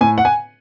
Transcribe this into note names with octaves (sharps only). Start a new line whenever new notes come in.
A2 G#5
F#5
G#5